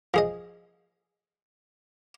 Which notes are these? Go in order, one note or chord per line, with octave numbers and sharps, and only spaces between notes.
F3 G#4 D#5